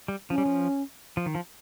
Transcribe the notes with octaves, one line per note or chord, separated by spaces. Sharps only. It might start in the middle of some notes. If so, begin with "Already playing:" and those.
G3
F3 C#4
G3
F3
F3
D#3
F3